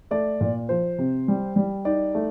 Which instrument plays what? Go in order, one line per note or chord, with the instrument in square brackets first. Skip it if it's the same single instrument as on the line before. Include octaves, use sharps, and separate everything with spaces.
[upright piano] A3 [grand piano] D5
[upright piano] A#2
[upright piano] F3 [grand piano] C5
[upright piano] C3
G3
G3
[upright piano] D#4 [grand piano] D5
[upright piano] A3